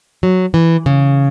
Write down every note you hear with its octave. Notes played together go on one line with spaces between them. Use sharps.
F#3
E3
C#3